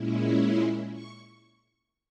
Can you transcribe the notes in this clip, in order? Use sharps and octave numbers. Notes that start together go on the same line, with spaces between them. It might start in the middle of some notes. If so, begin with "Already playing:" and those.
Already playing: A#2 G#3 C#4 E4
C6
C#6